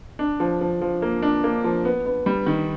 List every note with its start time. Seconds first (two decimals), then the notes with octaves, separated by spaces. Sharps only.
0.19 D4
0.40 F3
0.61 F3
0.81 F3
1.02 A#3
1.22 D4
1.44 A#3
1.64 F3
1.85 B3
2.06 B3
2.26 G3
2.46 D#3